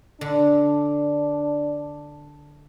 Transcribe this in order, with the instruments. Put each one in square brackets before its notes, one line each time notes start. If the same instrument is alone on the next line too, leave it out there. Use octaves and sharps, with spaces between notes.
[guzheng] D3 [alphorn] D4